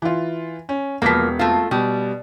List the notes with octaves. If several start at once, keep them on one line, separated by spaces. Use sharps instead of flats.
E3 F4
C#4
E1 F3 A#3 B3 B6
A3 C4 F4
B2 G3